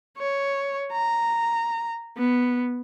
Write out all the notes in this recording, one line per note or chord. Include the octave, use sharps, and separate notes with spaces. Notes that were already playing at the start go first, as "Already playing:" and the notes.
C#5
A#5
B3